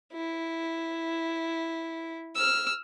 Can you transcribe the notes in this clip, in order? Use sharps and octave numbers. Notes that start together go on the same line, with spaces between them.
E4
E6 F6